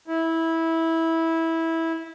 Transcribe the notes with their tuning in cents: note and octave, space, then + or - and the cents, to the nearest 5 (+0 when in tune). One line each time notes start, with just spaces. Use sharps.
E4 -15